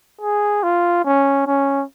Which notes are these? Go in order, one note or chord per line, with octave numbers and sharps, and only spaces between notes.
G#4
F4
C#4
C#4